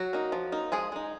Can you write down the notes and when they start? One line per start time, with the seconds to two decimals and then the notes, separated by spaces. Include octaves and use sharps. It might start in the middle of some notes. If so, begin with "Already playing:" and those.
Already playing: F#3 F#4
0.13 A#3 D#4
0.32 F3
0.52 A#3 D#4
0.72 F3 G#3 G#4
0.92 G#3 D#4